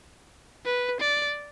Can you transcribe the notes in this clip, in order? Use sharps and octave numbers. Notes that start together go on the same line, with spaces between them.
B4
D5